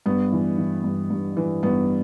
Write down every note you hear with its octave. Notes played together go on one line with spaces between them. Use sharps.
G2 B3
E3
E3
G2
G2
E3
G2 B3